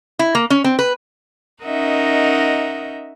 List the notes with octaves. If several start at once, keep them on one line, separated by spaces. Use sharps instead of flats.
E4
A#3
C#4
C4
B4
C#4 D#4 A#4 D#5 E5 F#5